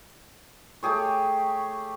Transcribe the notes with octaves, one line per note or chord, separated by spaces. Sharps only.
A3 G4 G#4 C#5